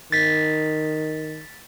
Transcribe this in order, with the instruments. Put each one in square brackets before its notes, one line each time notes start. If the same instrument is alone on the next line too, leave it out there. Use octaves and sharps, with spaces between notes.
[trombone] D#3 [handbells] A6 B6